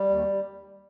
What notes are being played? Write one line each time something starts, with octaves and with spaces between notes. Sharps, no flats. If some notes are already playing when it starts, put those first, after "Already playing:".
Already playing: G3
D#2